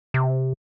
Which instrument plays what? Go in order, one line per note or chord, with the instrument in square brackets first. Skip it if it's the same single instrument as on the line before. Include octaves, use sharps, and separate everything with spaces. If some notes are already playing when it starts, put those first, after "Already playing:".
[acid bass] C3